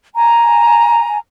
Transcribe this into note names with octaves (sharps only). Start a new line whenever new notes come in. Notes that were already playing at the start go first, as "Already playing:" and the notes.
G#5 A#5